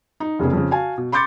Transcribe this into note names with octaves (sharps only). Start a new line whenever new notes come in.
D#4
F1 C#3 B3 G#4
F2 C#3
F#4 F5 G#5 A5
B2
B5 C6 D6 G6 A6 C#7